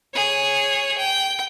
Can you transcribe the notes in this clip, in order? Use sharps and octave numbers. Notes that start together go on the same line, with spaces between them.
G#4 C#5
G5